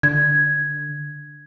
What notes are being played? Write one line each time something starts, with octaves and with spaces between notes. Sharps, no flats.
D3 G#6